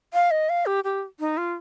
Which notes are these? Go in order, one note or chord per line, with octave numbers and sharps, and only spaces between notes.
F5
D#5
F5
G4
G4
D#4
F4